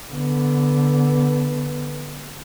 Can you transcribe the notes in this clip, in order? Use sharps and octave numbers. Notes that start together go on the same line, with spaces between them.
D3 B3